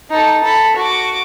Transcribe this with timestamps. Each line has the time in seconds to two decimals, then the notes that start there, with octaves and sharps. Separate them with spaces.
0.10 D#4 A4
0.44 A4 B5
0.76 F#4 D6